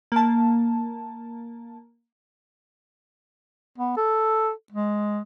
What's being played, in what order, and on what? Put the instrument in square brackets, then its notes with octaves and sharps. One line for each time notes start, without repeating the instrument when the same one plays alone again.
[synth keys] A#3 A5
[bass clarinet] B3
A4
G#3